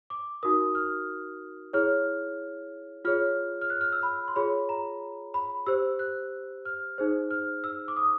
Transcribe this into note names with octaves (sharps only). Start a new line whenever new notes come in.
D6
D#4 F#4 A#4 D#6
F6
E4 G#4 C#5 F6
F4 G#4 C#5 F6
F6
F#6
F6
E6
B5
C6
F4 G#4 C#5 B5
A#5
B5
G4 C5 E6
F#6
F6
D#4 G#4 C5
F6
E6
D6
D#6